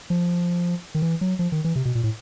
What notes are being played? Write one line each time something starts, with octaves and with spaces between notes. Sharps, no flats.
F3
D#3
E3
F#3
F3
D#3
E3
C3
B2
A#2
A2